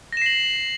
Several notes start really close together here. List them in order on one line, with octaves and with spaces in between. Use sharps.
A#6 E7 C7 F#7